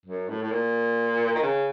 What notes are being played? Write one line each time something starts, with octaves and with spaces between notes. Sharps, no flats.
F#2
A2
A2
A#2
D#3
C#3